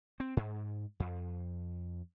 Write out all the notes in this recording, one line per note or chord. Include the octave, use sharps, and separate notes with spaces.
C4
G#2
F2